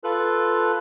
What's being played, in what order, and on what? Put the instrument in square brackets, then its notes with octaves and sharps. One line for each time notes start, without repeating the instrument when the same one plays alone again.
[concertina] F4 A4 B4 F#6